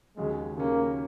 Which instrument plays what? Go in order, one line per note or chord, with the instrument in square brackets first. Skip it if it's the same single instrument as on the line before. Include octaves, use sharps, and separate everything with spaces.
[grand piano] D#2 C#3 F#3 C#4 G#4 [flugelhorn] G#3
[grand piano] D#2 C#3 F#3 C#4 G#4 [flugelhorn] A#3